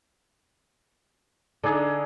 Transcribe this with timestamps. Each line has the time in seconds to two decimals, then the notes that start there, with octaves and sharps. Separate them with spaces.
1.64 D3 D4 D#4 G#4